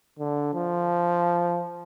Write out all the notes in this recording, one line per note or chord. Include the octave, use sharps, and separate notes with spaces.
D3
F3